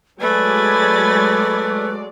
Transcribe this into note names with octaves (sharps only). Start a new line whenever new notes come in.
F#3 G#3 A3 B4 D5 G#5 B5 A6